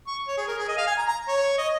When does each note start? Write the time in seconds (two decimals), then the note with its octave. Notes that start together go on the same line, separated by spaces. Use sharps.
0.07 C#6
0.28 C#5
0.37 G#4
0.48 A#4
0.58 G#4
0.68 D#5
0.78 F5
0.88 G#5
0.98 A#5
1.08 A#5
1.28 C#5
1.58 D#5